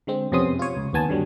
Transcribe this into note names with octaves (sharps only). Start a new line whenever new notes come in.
D3 G#3 C4
F2 C3 B3 C#4 C6 D#6
F4 C#5
C#2
D#2 B3 G#5 A5
G2 D3 F#3 G3